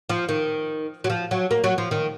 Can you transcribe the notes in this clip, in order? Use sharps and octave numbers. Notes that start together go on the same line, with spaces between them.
F3
D#3
F#3
F3
F#3
A#3
F#3
F3
D#3